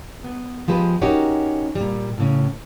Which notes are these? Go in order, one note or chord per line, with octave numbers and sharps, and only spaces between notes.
B3
F3 G#3 G4 B4
C#4 D#4 F#4 G4 A#4 C#5
A#2 G3
A2 C#3 C#4